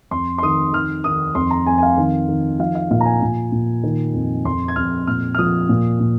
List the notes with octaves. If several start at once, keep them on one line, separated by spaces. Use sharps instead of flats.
F2 C6
C6
D#3 D#6
D#3 F6
D#3 D#6
F2 C6
A#5
F2 G#5
G#5
F5
D#3
D#3
F3 F5
F5
A#2 F5
A#5
G#5
A#2
A#2
D#3
F2
F2 C6
G#6
F2 F6
A#2 F6
F6
F3 D#6
A#2
A#2